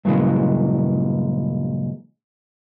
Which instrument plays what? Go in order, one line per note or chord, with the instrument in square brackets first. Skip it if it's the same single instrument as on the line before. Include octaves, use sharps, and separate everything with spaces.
[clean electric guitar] G2 A#2 C#3 E3 F#3 G#3